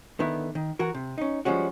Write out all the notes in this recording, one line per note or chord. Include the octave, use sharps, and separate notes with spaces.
D3 D#3 B3 E4
D#3
E3 F#4 A#4
C3
C#4 D#4
F3 G3 G#3 C#4 F#4